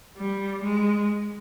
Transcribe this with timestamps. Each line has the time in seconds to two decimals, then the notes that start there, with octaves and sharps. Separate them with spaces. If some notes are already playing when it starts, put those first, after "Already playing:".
0.17 G3
0.62 G#3